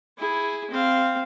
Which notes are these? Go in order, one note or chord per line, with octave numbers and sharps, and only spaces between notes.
E4 G#4
C4 F5